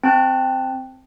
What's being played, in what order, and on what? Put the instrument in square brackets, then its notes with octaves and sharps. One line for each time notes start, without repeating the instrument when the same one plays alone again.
[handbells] C4 A5 F#6